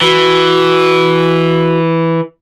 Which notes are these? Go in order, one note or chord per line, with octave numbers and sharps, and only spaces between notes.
E3 F#4